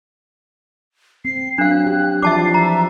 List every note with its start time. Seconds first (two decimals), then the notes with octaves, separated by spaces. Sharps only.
1.25 C4 C7
1.58 F#3 D4 F5 F#6
1.86 G4
2.22 E3 F3 D5 E5 A5 D6 C7
2.54 E5 A#5